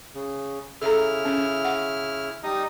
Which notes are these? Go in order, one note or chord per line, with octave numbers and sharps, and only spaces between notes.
C#3
C#3 E4 A4 A#5 F6
C#4
F#5
G3 D#4 D#5